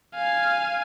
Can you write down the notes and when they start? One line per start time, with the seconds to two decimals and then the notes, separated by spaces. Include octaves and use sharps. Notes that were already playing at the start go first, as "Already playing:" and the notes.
0.15 F5 G#5